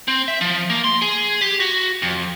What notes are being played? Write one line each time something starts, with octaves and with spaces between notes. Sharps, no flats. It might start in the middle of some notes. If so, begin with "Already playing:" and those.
C4
E5
F3
A#3
C6
G#4
G4
F#4
F2